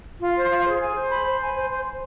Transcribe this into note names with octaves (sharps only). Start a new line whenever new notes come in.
F4
C5
F4
G#4
G#5
C5
B5
C5
G#5
C5
C5
C5